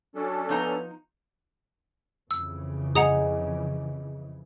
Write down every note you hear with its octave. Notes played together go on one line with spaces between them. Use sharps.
F#3 C#4 D4 A4
F3 B3 D#4 A#5
F2 C#3 E3 E6
G#4 D#5 F#5 A#5 D#6